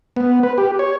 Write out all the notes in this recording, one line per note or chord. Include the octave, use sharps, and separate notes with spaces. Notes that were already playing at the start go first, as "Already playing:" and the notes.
B3
B4
G4
C#5